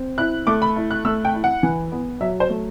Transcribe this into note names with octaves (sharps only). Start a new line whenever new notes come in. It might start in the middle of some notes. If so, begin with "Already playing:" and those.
Already playing: C4
E4 F#6
A3 D6
B5
E4
F#6
A3 E6
G5
E4
F#5
E3
B3
F#3 E5
C5
A3